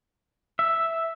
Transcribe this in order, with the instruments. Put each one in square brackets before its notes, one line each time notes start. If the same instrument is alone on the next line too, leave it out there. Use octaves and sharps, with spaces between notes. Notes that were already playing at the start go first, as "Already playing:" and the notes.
[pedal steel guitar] E5